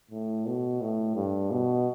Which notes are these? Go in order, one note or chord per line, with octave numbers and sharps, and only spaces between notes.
A2
B2
A2
G2
B2